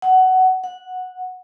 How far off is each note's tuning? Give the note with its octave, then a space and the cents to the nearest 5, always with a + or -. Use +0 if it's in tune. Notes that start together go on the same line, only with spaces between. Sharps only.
F#5 +15
F#5 -10